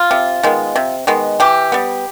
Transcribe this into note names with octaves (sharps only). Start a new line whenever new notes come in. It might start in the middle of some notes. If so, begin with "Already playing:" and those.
Already playing: F4
C3
D#3 G#3 B3
C3
D#3 G#3 B3
E3 G4
G3 B3